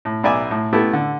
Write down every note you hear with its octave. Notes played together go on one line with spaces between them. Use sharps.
A2
B1 D5 E5 G#5 D6 E6
A2
A3 B3 E4 G4 A4
D3